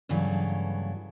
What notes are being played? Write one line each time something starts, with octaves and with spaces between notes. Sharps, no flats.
G2 C#3 E3 F#3 A3